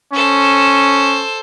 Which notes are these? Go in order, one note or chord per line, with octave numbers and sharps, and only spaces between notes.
C#4 A4 C5